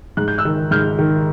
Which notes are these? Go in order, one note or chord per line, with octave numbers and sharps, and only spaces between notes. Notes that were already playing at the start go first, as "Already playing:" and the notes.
G#2 F#6
G6
E6 F#6
D#3
G#2 F6 G6
D#3